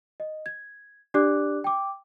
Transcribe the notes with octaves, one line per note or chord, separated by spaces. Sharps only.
D#5
G#6
D4 G4 D5 D6 F#6
G5 D6